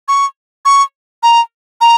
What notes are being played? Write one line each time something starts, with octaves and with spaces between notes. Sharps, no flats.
C#6
C#6
A#5
A#5